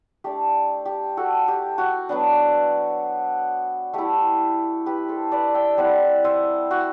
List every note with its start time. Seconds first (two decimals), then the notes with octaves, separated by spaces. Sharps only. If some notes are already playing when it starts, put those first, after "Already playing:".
0.24 A3 D4 G4
0.86 G4
1.17 F#4 A4
1.48 G4
1.78 F#4
2.09 F#3 B3 D4
3.94 A3 E4 G4
4.86 G4 B4
5.08 A4 C5
5.32 B4 D5
5.55 E5 G5
5.77 G3 C4 E4 D5 F#5
6.24 C5 E5
6.71 F#4